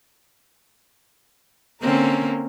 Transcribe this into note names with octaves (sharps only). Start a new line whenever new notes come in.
D3 A#3 C4 C#4 A#4